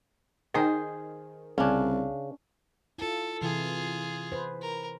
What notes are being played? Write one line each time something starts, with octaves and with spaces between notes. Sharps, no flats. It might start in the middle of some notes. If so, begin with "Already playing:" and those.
D#3 G#4 C5
C2 C#3 C#4 D4
E4 F4 A4
C3 E3 E4 F4 G#4
B4 C5
A#4